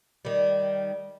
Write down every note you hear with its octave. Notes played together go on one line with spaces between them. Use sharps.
D#3 G3